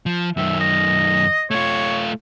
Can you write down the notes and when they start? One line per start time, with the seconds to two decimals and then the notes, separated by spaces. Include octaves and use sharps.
0.06 F3
0.37 F#2 D#3 E5
0.60 D#5
1.51 A3 F4 C#5